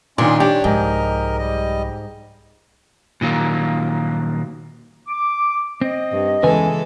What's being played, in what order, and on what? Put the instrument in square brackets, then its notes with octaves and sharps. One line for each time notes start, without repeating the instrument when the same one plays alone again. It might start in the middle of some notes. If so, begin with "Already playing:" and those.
[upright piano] A#2 D#3 [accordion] C#4 D#5 C6 [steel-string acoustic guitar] D4
[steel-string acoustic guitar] D4 [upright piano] G4 [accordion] C#5
[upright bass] C2 F3 [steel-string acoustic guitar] G#2 [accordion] A#4 D#5
[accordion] G3 D#5
[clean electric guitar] A#2 D#3 F#3 A#3
[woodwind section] D6
[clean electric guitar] C4 [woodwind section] D#5
[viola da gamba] G2
[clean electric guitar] E2 C#3 G#5 [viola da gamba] E3 G#3 A4 [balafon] B4